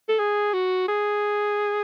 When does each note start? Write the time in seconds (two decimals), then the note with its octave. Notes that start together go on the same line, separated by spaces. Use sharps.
0.09 A4
0.19 G#4
0.53 F#4
0.88 G#4